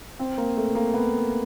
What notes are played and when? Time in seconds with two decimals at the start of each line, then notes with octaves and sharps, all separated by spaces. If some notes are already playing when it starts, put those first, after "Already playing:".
0.19 C4
0.38 A#3
0.57 A3
0.75 A#3
0.94 B3